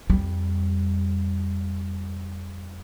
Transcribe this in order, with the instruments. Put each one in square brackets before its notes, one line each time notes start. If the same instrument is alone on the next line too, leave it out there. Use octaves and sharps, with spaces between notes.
[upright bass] F2 G3